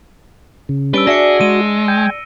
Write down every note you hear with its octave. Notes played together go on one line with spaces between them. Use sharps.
C#3
G3 C#4 D4 B4 E6 D7 G7
D4 F#4 G#4 E5 A#6 C#7
G#3 D#7
G5 G#5